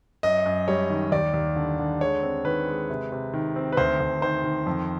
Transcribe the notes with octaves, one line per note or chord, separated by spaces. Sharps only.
F#2 D#5
F#2
G3 C#5
D#3
D#2 D5
D#2
D3
D3
G#3 C#5
C4
D#3 B4
G#3
C3
C3
D#3
C4
B4
D2 C5
D2
D#3 C5
D#3
F2